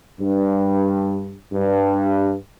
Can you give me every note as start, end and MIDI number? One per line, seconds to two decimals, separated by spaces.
0.21 1.33 43
1.52 2.34 43